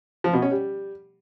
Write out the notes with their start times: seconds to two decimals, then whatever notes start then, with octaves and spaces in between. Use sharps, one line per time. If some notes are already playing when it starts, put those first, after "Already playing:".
0.24 F3
0.33 B2
0.42 C#4
0.51 G3